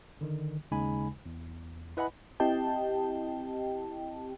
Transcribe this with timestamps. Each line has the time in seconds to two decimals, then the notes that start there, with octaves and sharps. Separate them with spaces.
0.21 D3 D#3
0.72 D#2 C#3 G#3 D#4 G#5 B5
1.26 E2
1.97 E4 B4 D#5 F#5 G#5 B5
2.40 C4 E4 G4 D#5 G5 A5